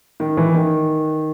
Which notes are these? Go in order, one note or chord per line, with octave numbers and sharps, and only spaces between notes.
D#3
E3
D#3